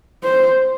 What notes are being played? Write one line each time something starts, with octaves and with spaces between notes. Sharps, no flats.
C5